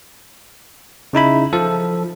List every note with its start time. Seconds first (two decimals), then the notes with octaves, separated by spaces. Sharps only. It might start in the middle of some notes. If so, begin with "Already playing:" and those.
1.13 C#3 D#4 E4 B5
1.53 F3 A4